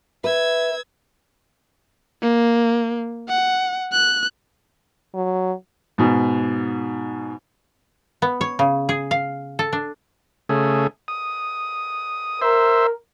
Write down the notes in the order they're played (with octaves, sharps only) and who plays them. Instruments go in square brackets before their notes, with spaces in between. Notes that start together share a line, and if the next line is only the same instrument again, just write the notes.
[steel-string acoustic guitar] B4 [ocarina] E5 [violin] E6 G#6
[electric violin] A#3
F#5
F#6
[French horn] F#3
[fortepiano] G#2 B2
[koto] B3
C#5
C#3
G#4
F5
A4
D4
[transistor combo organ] C#3 A3 G#4
D#6
[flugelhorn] A#4 [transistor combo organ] C5 E5